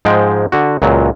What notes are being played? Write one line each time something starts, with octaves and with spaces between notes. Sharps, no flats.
G#2 F3 G#3 G5
D3 F#4
C#2 A#2 F#3